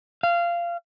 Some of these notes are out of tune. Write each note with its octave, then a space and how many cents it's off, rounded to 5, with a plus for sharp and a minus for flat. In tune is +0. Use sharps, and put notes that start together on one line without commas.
F5 -20